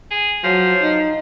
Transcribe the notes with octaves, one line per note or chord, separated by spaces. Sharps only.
G#4
F3 F#3
D#4